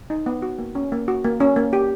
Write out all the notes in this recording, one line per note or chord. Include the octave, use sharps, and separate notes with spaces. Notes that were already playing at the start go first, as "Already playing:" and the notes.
D#4
B3
F#4
A#3
C#4
A#3
F#4
A#3
C#4
A#3
G4